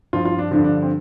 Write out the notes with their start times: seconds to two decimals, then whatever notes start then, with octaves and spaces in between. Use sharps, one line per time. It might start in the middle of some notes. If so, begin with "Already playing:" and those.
0.13 G2 F3 F4
0.25 F4
0.38 D4
0.51 G2 D3 F3 D4
0.64 D4
0.82 C4